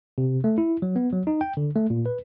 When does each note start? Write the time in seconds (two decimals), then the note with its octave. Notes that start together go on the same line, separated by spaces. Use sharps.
0.18 C3
0.44 A3
0.58 E4
0.82 F#3
0.96 B3
1.12 F#3
1.27 D#4
1.41 G5
1.57 D3
1.76 A3
1.90 A#2
2.06 B4